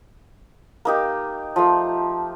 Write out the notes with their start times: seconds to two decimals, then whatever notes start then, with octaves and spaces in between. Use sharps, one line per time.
0.85 A#3 D#4 G4
1.56 F3 A3